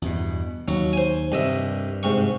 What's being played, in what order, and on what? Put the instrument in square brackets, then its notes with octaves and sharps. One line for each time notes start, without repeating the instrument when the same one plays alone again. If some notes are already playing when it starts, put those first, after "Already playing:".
[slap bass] E2 G2 B2
[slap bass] D#2 [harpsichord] F#3
[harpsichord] C5 G#5
[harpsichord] C2 D#5 E5 [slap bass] G2
[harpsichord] G#2 C3 C#6